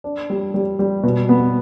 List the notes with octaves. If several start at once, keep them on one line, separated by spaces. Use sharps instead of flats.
D4
G3
G3
G3
B2
B3